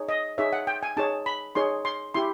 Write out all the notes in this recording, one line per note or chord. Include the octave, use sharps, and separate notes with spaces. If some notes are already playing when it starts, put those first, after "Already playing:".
Already playing: D#4 G#4 C#5
D#5
D#4 G#4 C#5 E5
F#5
G5
G#5
D#4 G#4 C#5 A5
B5
D#4 G#4 C#5 C6
C6
E4 G4 C6